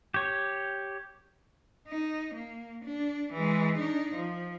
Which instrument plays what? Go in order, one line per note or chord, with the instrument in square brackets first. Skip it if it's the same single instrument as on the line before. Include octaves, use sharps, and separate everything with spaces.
[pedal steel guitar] G4 C#5
[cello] D#4
A#3
D4
E3 G#3
D4 D#4
F3